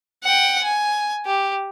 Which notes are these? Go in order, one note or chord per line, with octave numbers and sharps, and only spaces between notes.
F#5 G5
G#5
G4